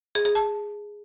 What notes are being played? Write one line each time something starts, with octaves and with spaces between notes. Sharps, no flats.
G#4
G#4
A5